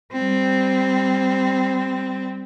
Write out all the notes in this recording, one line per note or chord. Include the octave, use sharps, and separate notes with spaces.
G3 C4